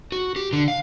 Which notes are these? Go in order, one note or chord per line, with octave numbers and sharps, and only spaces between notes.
F#4
G4
D3
F5